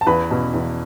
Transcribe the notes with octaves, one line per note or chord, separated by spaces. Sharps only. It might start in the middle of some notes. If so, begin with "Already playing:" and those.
A5
E2 B4 B5
B2
E2